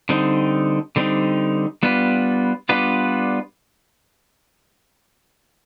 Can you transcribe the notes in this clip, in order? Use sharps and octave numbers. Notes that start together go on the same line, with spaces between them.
D3 G3 C4 D#4
D3 G3 C4 D#4
G3 B3 D4 F4 B4
G3 B3 D4 F4 B4